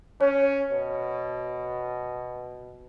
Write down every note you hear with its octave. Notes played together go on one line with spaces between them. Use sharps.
C#4 C#5
B2